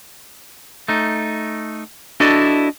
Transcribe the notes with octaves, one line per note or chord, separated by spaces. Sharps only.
A3 D#4
D4 E4 F#4 A4 D5 D#5